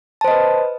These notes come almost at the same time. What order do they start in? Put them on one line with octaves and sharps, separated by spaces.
A5 C5 D#5 B4